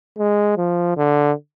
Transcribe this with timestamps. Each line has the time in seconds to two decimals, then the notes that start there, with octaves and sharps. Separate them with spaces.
0.18 G#3
0.57 F3
0.97 D3